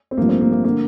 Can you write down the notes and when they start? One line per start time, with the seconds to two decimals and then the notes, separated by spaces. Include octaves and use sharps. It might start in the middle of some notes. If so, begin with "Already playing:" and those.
0.11 C4
0.17 A1 G2 F3 A#3
0.29 C4
0.41 A#3
0.52 A#3
0.64 D3 A#3